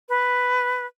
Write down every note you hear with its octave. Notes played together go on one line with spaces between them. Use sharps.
B4